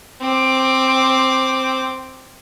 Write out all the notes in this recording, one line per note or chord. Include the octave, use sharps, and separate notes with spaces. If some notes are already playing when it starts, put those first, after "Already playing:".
C4 D6